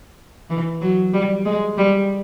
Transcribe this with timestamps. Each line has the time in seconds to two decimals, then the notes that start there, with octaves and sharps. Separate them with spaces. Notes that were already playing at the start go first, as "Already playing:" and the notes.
0.50 E3
0.82 F#3
1.13 G3
1.45 G#3
1.78 G3